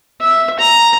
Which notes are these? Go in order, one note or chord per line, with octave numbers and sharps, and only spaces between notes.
E5
A#5